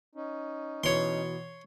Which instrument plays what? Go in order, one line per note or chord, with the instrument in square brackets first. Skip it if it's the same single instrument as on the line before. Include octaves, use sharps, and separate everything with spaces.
[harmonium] C#4 D#4
[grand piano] B2 E3 [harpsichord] C#5 C6